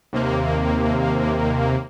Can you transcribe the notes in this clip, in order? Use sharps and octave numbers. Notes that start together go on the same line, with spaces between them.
D#2 C3 A#3